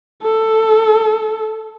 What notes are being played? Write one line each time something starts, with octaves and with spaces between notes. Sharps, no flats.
A4